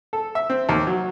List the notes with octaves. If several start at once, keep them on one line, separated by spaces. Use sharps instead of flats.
A4
E5
C4
D#2
F#3